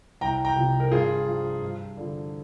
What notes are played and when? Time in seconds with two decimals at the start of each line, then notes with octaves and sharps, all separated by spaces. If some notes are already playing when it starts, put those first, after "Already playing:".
0.21 C2 G5 A#5
0.45 G5 A#5
0.56 C3 F3
0.80 A#4
0.92 G2 F4 G#4
1.27 F3
1.62 G2
1.97 D3 F3